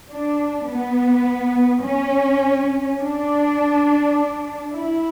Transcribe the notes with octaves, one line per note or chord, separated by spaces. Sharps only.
D4
B3
C#4
D4
E4